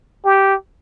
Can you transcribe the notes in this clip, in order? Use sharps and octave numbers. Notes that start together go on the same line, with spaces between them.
G4